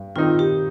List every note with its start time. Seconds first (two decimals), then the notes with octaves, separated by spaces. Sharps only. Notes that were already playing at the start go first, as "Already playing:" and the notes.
Already playing: G2
0.16 D#3 C4 D#4 F4
0.39 G4